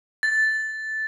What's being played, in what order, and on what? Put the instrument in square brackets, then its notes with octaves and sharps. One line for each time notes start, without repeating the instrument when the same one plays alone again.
[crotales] A6